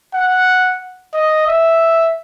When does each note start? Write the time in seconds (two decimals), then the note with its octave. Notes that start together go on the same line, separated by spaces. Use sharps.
0.14 F#5
1.14 D#5
1.47 E5